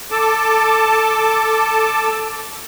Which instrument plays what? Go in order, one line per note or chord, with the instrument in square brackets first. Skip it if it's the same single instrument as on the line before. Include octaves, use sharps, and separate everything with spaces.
[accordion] A4 A5 D6